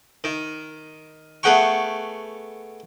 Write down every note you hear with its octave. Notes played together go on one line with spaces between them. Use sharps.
D#3
A3 B3 G#4 F#5 G5 C#6